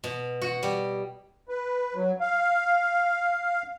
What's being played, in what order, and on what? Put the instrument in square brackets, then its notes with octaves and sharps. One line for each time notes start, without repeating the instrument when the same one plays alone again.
[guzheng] B2
F#4
G3
[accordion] B4
F#3
F5